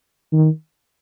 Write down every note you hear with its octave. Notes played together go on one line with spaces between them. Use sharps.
D#3